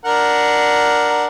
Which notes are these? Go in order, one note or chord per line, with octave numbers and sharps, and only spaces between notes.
D4 A#4 F#5